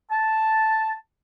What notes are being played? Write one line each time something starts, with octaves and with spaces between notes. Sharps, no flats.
A5